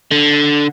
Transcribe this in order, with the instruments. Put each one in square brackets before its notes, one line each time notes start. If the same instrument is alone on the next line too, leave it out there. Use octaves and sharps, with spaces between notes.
[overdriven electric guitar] D3